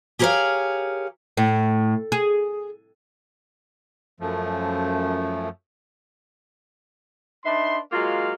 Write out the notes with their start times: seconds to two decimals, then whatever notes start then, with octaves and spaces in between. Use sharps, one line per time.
0.19 G4 G#4 A#4 B4 C#5 F5
1.37 A2
2.12 G#4
4.20 F#2 F3 A3
7.45 D4 D#4 B4 E5 C6
7.92 F#3 G#3 A#3 F4 F5